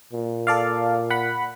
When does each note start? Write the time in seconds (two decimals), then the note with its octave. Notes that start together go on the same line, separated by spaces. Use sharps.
0.13 A#2
0.47 A4 D5 F5
1.10 F#5 B5